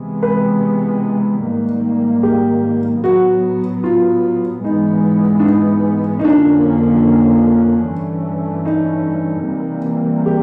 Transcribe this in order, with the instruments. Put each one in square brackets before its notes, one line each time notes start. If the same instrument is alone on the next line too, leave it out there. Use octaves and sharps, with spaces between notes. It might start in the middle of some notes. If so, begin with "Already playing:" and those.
Already playing: [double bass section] C3 E3 G#3 B3
[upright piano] B4
[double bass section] G#2 D#3 G3 A#3
[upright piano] G4
[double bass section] A2 F#3 B3 [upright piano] F#4
[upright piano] F4
[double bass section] G#2 E3 G#3 B3 [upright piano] D#4
[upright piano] D4
D#4
D#4
[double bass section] F2 D3 F3 A#3 C#4 [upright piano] D4
[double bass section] G2 E3 A3 C#4
[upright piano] D#4
[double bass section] C3 E3 G3 A#3
[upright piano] G4